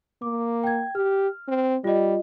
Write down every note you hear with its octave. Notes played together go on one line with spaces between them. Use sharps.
A#3 D6
G5 G#6
G4 F6
C4
G3 F4 D#5